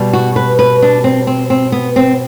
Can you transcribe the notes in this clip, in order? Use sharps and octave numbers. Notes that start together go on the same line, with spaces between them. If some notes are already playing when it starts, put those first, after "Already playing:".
Already playing: B2 G3
F#4
B4
B4
D4
C4
C4
C4
B3
C4